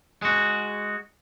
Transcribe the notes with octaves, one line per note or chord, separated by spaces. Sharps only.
G#3 F#4